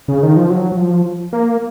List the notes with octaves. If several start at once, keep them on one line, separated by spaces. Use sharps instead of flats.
C#3
D#3
F3
F#3
F#3
F3
A#3